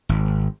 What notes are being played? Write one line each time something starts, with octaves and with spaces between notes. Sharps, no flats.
G#1